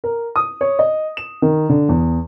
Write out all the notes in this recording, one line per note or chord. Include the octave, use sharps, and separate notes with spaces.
A#4
D#6
C#5
D#5
E7
D#3
D3
E2